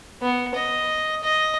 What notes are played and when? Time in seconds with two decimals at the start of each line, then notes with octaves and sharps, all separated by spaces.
0.22 B3
0.55 D#5
1.23 D#5